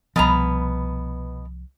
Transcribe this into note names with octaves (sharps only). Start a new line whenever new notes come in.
C2 B2 F3 B3 A#5